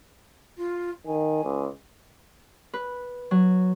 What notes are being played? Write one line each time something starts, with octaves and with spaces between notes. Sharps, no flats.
F4
D#3 G#5
C#2
B4
F#3